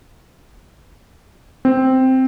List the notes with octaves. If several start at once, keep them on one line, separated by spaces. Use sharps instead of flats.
C4